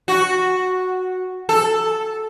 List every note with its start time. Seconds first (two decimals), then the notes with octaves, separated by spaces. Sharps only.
0.08 F#4
1.49 A4